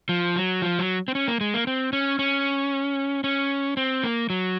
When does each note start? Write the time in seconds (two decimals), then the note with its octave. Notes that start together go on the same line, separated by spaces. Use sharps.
0.09 F3
0.36 F#3
0.62 F3
0.79 F#3
1.08 C4
1.15 C#4
1.28 A#3
1.41 G#3
1.54 A#3
1.67 C4
1.93 C#4
2.19 C#4
3.24 C#4
3.77 C4
4.04 A#3
4.30 F#3